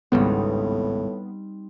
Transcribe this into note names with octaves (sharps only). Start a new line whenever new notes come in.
G#1 C#2 A2 G3 B3 C4 D#4